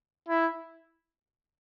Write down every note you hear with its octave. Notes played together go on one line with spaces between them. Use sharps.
E4